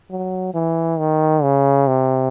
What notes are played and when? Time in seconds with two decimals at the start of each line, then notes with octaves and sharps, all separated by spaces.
0.10 F#3
0.54 E3
0.99 D#3
1.43 C#3
1.87 C3